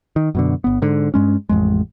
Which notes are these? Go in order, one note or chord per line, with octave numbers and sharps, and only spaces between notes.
D#3
F#2 B2 D3
G1 B3
G#2 D3
G2 G#3 C#4
A1 F2 G#3